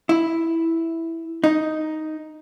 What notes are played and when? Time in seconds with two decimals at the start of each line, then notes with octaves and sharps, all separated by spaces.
0.09 E4
1.44 D#4